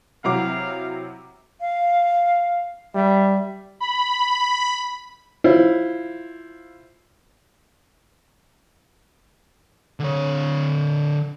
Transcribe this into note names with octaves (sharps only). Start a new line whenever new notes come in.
C3 F#3 E4 F5 F#5 A#5 D6
F5
G3 E5
B5
E4 F4 C5
D3 C#5